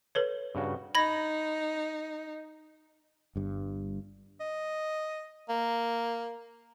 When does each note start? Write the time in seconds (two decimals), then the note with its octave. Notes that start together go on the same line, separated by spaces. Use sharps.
0.15 A4 B4 C#5
0.55 G2 C#3 F#4
0.95 D#4 B5 G#6 A#6
3.36 G1 G2
4.40 D#5
5.49 A#3